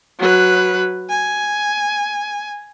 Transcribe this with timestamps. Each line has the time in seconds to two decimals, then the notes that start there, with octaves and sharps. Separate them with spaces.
0.19 F#3 B4
1.10 G#5